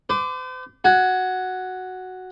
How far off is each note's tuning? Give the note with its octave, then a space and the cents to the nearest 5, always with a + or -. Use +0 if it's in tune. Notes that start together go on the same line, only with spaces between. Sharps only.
C5 -45 D6 +0
F#4 +0 G#5 +15